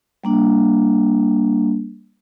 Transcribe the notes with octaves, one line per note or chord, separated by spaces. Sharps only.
G3 A#3 D4